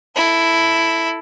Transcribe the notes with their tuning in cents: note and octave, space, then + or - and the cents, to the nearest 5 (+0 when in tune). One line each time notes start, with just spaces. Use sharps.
E4 +0 A4 +0